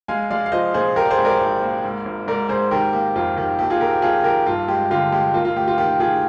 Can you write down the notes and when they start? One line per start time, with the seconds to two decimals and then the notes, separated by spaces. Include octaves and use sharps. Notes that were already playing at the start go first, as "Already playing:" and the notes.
0.08 G#3 F5 G#5
0.30 G#3 D5 F5
0.46 F5
0.52 F3 C5 D#5
0.74 A#2 G#4 C5
0.96 A#3 G4 A#4
1.05 D5
1.11 G#4 C5
1.18 G#1
1.25 A#4 D5
1.41 G#1
1.62 A#3
1.84 G#2
2.05 G#1
2.28 G#2 A#4 D5
2.49 G#2 G#4 C5
2.71 D#3 G4 A#4
2.93 A#3 G4
3.15 F2 F4
3.37 D#3 G4
3.59 A#1 G4
3.70 F4 G#4
3.80 A#1 G4 A#4
3.91 G4
4.02 A#1 F4 G#4
4.24 D#3 G4 A#4
4.46 G2 F4
4.68 G#3 G4
4.91 D3 F4
5.12 G#3 G4
5.34 A#3 F4
5.45 F4
5.56 D2 G4
5.68 F4
5.78 D#3 G4
6.00 D#3 F4 G#4